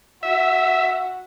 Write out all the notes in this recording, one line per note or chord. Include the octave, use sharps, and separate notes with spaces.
F#4 E5